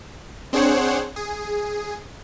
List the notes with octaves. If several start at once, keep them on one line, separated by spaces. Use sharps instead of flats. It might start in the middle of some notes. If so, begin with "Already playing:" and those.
C4 D4 G#4 C5 C#5 F#5
G#4